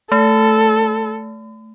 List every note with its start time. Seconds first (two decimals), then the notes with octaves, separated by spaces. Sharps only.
0.12 A3 A4